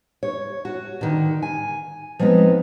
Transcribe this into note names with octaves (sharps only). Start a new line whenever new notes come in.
C#5
F#4
D3 D#3
G#5
F3 G#3 B3 C4 D#4